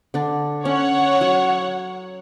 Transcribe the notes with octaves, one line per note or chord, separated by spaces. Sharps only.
D3 D4
C#4 C#5 F#5
F#3